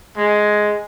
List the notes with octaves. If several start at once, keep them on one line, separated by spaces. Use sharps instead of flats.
G#3